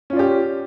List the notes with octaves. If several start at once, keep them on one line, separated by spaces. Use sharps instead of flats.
C#4 F4 G4 D5